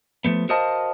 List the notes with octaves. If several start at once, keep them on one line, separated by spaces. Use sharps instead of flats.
F3 A3 B3
F#4 A#4 C5 D#5 F5 A5